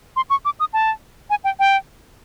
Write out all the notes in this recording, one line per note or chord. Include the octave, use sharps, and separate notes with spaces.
C6
C#6
D6
D#6
A5
G#5
G5
G5